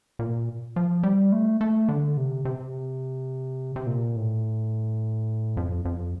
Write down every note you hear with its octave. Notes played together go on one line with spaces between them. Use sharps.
A#2
F3
G3
A3
A3
D3
C3
C3
C3
A#2
A2
F2
F2